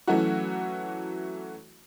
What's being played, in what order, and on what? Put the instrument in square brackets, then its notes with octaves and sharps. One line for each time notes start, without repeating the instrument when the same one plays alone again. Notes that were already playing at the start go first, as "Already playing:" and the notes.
[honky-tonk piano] E3 F#3 A3 C#4 E4 F#4